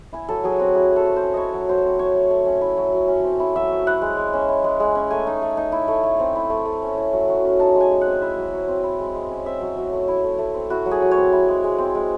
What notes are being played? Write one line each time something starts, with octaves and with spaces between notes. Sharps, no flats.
E4 G#5
F#3 A4
F#3 G#4
C4 F#4
E4 G#4
A3
A4
A3
C5
C#4
E4 C#5 D#5
F#3
F#3 C5
C4
E4 C#5
A3
A3
C#4
E4
F#3
F#3
C#4
C4
E4
F#3 E5
A3
E4 F#5
G#3
G#3
C#4
E4
G#3
G#3
C#4
A3 G#5
D#4
A3
D#4
E4
A3
A3
C4
E4
A3
A3
C#4
E4
F#3
F#3
C#4
D#4 A5
G#3
G#5
G#3
C4 F#5
E4 E5
F#3
F#3
C4
E4
G#3
G#3
C#4
C4 E5
F#3
F#3
A3
E4
A3
A3
C4
E4 F#4
F#3
G#4
F#3
C#5
C4
E4
G#3
G#3
C4
G#3